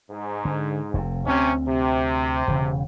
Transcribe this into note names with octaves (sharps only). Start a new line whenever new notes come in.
G#2
D3
F1 C3
D2 C3 C4 C#4
C3
E1 C#3